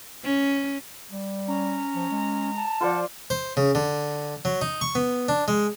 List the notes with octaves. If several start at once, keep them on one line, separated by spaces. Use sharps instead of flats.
C#4
G3
C#4 A#5
F3
G#3
A5
F3 F4 C5 D5 F#5
C5
C#3
D3
F#3
D#4
C#6
B3
D4
G#3